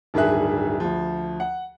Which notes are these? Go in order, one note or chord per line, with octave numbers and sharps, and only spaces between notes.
D1 G2 D#3 G#4 E5 F#6
D2 F3
F#5